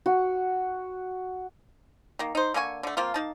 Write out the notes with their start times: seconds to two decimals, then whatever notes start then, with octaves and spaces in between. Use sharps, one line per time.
0.06 F#4
2.19 D#3 A#3
2.35 D#4 C5
2.54 D3 A#3 G#5 C#6
2.83 D3 A3
2.97 F3 A#3 C4 F4
3.14 A#3 D#4 A5